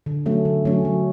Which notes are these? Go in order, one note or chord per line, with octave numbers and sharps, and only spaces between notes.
D3
F#3 A3 C#4
D3
F#3 A3 C#4
F#3